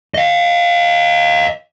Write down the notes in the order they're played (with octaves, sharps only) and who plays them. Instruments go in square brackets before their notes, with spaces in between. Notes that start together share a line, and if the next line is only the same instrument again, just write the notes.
[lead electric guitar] D#5 F5